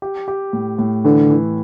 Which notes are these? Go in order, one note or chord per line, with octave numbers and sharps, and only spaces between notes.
G4
G4
A2
A2
D3 E3
E3